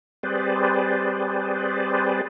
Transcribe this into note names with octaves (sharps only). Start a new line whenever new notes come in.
G3 C4 G#4 B4 C5 D5